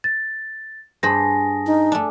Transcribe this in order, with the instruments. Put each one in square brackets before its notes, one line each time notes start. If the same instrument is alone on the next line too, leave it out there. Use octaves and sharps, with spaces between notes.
[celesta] A6
[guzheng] G2 C5 B5 [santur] G#4 [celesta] A5 A#6
[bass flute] D#4
[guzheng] A3 D4